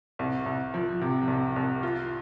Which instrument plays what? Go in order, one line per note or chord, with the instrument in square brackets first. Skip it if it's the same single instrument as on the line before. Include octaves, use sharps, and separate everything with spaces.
[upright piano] C2
C2
F3
C3
C2
C2
F4